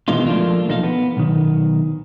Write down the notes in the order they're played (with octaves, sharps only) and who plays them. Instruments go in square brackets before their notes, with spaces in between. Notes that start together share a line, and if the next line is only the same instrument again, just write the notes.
[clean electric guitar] B2 D#3 E3 G#3 D#4 F4
F3 A3 A#3 D4 F4
B1 F3 D#4 A4 A#4 F5
B3
B1 D#3